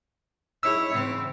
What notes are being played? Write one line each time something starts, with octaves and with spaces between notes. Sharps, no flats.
F#2 D#4 E4 G#4 C#5 E6
G#2 C#3 E3 C4